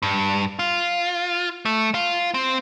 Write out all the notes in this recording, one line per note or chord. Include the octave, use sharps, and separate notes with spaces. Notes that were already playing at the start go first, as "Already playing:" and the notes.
G2
F4
A3
F4
C4